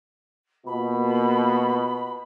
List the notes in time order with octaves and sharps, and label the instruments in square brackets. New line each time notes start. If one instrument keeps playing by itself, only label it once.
[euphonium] B2 [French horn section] A#3 F4 [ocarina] B5